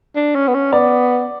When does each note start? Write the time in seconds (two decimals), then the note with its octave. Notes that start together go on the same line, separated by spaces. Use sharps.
0.16 D4
0.35 C#4
0.48 B3
0.54 C#4
0.72 B3 D5